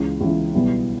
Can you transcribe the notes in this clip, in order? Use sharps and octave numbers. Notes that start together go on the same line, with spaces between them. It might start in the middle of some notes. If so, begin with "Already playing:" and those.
Already playing: C#2 C#3 E3
C#2 C#3 E3
B1 B2 G3 B3 E4